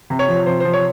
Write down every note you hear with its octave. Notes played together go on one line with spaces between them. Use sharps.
C3
C#5
F3
C3 C5
C5
F3
C#5